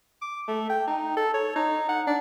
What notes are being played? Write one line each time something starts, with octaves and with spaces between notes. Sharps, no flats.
D6
A3
G5
D#4
A4
C#5
D#4
F#5
D4